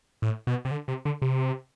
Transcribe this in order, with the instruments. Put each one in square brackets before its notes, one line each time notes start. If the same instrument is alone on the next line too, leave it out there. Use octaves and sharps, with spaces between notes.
[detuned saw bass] A2
B2
C3
D3
C3
D3
C3